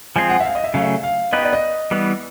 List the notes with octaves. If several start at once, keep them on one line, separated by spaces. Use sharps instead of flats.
F3 G#3 C4 F4 G#4 G#5
F#5
E5
F5
D#5
E5
C#3 F#3 A3 C#4 F5
E5
F5
B3 D#4 G4 B4 D#5
D5
D#5
E3 G3 B3